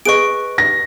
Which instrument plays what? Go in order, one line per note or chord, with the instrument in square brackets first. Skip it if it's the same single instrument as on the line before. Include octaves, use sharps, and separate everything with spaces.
[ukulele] G#4 B4 D#5 [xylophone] C#6 D7
[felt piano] A#6